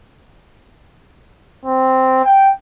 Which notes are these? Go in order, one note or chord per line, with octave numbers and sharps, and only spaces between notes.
C4
G5